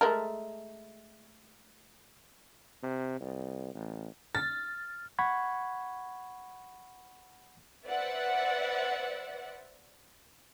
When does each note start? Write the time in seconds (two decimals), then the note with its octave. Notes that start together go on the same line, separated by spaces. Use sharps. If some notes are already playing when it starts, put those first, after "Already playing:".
0.01 G#3 A3 A#4
2.83 C3
3.21 C2
3.75 A1
4.35 F6 A6
5.19 F#5 B5 C#6 G#6
7.85 B4 C5 D5 E5 F#5